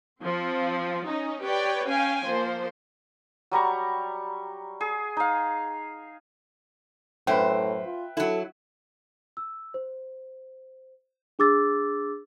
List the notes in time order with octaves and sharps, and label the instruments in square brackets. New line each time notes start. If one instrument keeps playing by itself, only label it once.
[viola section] F3 C4
C#4 D#4
G4 B4 C#5 D5 G5
C#4 F5 G5 G#5
F3 A#3 C5
[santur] F#3 G3 A#5 C#6
G#4
D#4 F5
[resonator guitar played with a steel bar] F#2 C5 [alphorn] A2 [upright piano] B4 E5 G5
[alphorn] F4
[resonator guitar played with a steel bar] F#3 E4 [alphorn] A4
[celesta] E6
C5
D4 G#4 D6 E6 A6